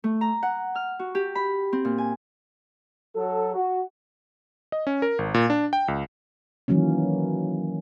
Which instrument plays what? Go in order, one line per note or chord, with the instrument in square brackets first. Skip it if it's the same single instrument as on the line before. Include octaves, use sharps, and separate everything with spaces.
[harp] A3
A#5
F#5
F6
F#4
G4
B5
C4
A#2
G#5
[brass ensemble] F#3 A4
F#4
[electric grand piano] D#5
C#4
A#4
G#1
A#2
D4
G5
C#2
[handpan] D#3 E3 F#3 A#3 C#4